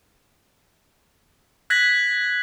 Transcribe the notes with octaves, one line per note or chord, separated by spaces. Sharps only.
F#6 G#6 A#6 B6 F#7